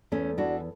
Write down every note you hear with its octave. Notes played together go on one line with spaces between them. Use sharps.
E2 A3 C#4
E3 D4 F#4